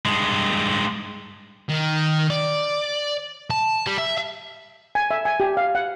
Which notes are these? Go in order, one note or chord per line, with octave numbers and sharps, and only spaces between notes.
G2 G#3
D#3
D5
A5
G3
E5
G#5
E5
G#5
G4
F5
F#5